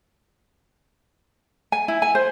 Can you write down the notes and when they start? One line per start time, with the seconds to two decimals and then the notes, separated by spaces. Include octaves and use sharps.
1.72 G#5
1.88 E4
2.02 G#5
2.15 C5